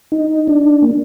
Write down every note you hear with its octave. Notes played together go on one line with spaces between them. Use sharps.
D#4
D4
A#3